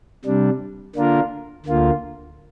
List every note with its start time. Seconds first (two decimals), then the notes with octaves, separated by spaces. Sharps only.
0.25 C3 G3 D4
0.95 D3 A#3 D4 F4 A#4
1.66 D2 D3 A#3 F4